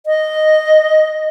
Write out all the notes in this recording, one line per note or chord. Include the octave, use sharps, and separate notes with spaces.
D#5